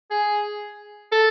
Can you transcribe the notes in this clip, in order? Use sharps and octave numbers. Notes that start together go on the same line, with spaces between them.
G#4
A4